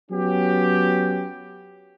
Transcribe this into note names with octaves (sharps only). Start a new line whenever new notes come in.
F#3 B3 C#4 G4